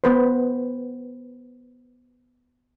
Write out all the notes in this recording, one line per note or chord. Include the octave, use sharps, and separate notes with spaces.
B3 B4 C5